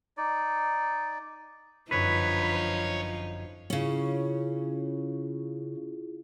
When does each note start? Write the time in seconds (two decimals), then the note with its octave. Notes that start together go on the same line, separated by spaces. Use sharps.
0.17 D#4 D5
1.91 G1 F#2 F3 D#4 B4 C#5 G#6
3.70 C#3 C#4 E4 F4 G#4